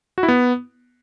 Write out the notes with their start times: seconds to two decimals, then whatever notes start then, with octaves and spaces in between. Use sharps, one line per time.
0.18 F#4
0.23 E4
0.28 B3